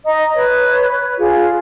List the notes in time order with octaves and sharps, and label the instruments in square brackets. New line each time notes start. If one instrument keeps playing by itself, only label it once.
[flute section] D#5 A#5 D#6
B4 C#5
F4 G#4